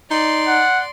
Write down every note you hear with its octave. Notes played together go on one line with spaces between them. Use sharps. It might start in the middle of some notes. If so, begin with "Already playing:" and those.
D#4 D5 C6
F#5